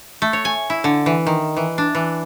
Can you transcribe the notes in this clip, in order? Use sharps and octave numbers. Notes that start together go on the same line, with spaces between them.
A3
C#5
G#5
E4
D3
E3
D#3
E3
D4
E3